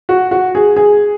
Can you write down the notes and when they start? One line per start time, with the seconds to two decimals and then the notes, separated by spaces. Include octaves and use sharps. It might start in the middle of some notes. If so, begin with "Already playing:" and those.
0.09 F#4
0.31 F#4
0.55 G#4
0.76 G#4